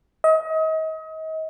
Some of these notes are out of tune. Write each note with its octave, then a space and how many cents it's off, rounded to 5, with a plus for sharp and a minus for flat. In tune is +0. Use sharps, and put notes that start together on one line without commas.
D#5 +35